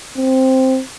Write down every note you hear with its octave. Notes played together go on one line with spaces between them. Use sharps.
C4